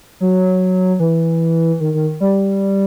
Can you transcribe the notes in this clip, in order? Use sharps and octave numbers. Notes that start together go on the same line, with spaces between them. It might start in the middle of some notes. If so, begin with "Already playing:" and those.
F#3
E3
D#3
D#3
G3